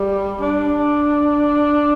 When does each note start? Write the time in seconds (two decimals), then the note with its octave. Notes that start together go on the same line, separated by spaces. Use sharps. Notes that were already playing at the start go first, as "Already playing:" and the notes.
Already playing: G3
0.41 D4